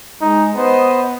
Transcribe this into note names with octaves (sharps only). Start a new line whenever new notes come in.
G#3 D#4
B3 C5 D#5